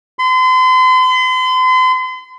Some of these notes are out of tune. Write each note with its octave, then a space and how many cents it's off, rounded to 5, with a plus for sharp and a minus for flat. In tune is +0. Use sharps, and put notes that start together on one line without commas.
C6 -40